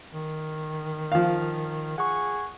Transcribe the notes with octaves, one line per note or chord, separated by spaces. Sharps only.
D#3
F3 F5
G#4 F#5 C#6